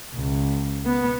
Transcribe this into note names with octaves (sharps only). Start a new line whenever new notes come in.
C#2
B3